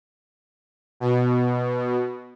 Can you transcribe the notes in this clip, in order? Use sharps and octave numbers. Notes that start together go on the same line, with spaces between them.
B2